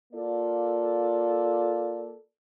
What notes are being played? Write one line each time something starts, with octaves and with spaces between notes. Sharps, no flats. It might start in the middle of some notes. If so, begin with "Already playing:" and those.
A#3 F4 A4 D5